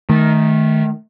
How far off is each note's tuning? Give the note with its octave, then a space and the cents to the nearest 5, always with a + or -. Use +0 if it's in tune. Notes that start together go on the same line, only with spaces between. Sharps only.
D#3 +0 A3 -20